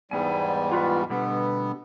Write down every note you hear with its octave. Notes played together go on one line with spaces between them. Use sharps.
E2 G#2 G3 B3 G#5
F4 F#4 B4
B2 D3 G3 B3